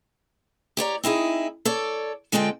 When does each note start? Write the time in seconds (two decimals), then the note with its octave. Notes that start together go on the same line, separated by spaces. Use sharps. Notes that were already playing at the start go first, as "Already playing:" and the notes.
0.77 G4 C#5 D5 A#5
1.04 C4 D#4 E4 G#4
1.65 A4 C#5 D5
2.32 D3 G#3 C4 F4 A4 G5